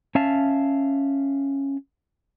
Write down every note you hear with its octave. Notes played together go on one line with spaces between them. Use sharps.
C#4 E5 F5 A5